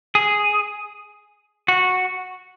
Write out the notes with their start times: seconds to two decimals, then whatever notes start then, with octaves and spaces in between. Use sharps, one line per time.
0.15 G#4
1.68 F#4